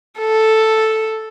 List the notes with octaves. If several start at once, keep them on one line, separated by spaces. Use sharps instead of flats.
A4